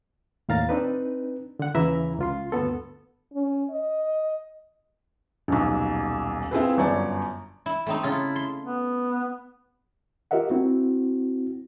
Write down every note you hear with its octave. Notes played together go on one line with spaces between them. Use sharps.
D#2 A2 F5 A#5 A6
C4 D4 D#4 B4
D3 F#5
D#2 C#3 E3 E5 A#5 B5
C#2 F4 C6
D2 G2 B3 A4
C#4
D#5
D#1 B1
C4 E4 F4 G#4 A4 B4
G1 F#2 C#5 D5 A5
E4
A3 C4 D#4
C#3 E4 F4 A4
C6
B3
F4 G4 A#4 D#5 E5 F#5
C4 E4 F#4